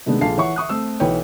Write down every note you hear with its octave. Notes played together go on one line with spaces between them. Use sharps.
C3 D#3 G#3 A3 B3 D4
A#1 G#4 A4 F5 A5 C7
E3 C#5 E5 F#5 C#6
E5 C#6 D#6 F#6
A3 C4 E6
B1 E3 B4 C#5 G5